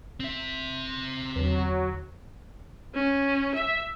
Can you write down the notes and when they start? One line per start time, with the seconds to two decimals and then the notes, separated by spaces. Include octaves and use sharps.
0.20 C4 E5
1.36 E2 D3 F#3
2.95 C#4
3.55 E5